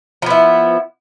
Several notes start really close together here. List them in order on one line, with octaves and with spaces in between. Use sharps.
F3 B3 E4